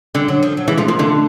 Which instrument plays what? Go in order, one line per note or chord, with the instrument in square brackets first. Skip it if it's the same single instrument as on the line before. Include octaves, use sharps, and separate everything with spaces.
[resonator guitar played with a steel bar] D3 [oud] G3
[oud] F#3
F3
F#3
[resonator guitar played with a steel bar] E3 [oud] G#3
[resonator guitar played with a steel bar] F3 [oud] A3
[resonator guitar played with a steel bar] F3 [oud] A#3
[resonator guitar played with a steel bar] D3 [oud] A3